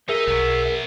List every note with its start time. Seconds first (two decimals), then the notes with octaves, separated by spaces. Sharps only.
0.09 D#4 G#4 A#4 D#5 E5
0.27 B1 F#3 B3